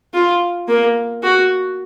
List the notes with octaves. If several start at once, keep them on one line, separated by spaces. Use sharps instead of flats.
F4
A#3
F#4